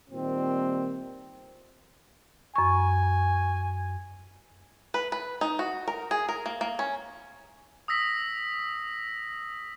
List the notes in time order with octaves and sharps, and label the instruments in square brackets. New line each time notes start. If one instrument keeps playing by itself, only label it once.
[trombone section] A#2 D#3 G3 C4
[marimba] F#2 C#6 [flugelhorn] G#5
[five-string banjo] B4
B4
D#4
F#4
A#4
G#4
A#4
A#3
A#3
C#4
[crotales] D#6 E6 A#6 B6